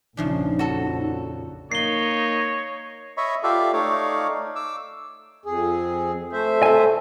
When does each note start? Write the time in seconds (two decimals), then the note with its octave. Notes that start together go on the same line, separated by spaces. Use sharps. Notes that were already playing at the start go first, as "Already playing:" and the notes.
0.17 A#1 F2 C#3 F3 D4 D#4
0.59 F#4 A4
1.72 A#3 D#4 C#5 C7 G7
3.17 C#5 D#5 E5 B5 C#6
3.43 F4 G4 A4 D5 E5 F5
3.73 A3 D#4 C#5 D5 F5
4.56 D6 E6
5.46 F2 G#4
6.32 A3 C5 E5
6.63 A4 G#5